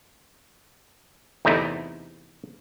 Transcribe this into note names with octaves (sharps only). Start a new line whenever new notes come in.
E2 C3 A3 D#4 E4